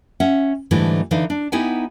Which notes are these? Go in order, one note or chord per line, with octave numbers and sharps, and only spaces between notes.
C#4 E5 F#5
G#2 D3 E3 G3 A3
D3 E3 D#4 B4 F5
D4
B3 D#4 E4 G4 F#5 G#5